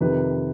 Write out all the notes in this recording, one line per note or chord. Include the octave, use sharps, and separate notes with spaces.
F2 C3 D#3 B4